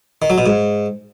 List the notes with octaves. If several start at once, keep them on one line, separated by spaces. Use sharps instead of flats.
D#3
F#3
B2
G#2